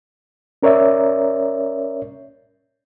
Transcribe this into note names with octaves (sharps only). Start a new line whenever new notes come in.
C#4 A#4 C#5 D5 E5